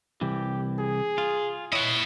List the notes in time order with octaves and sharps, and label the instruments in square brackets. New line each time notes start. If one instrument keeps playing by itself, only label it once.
[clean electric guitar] C2 E3 [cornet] G4
[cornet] G#4
[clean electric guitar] F4
[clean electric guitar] E4 [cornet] C#5 [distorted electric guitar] D#5 F#5